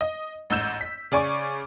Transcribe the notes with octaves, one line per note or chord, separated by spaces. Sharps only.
D#5
A1 G#2 E6 G6 E7
B6
C#3 D5 G#5 C#6 D6